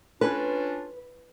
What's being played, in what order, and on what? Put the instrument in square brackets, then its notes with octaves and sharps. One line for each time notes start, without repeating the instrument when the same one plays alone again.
[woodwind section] C#4 D4 F4 [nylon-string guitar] B4